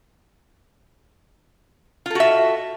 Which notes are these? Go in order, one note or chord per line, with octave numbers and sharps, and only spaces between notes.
F4 F#4 A4 E5